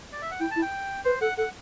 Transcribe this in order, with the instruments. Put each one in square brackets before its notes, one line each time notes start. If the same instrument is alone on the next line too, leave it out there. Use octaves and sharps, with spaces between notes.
[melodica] D5
E5
F#5
[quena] E4 [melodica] G5
[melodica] A5
[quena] E4
[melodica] G5
[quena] B4 [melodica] C5
[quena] A4 [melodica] F#5
[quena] A4 [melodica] F#5